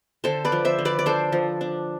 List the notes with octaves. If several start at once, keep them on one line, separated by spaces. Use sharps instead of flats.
D3 A4 C5
B4 D5
F3
C5 E5
D3
B4 D5
D5
D4 A4 C5
F3
D4